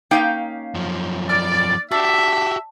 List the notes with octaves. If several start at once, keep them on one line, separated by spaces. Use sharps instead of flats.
A#3 C#4 D#4 F5 G5 G6
F#2 F3
D5 F6
D4 F#4 G4 E5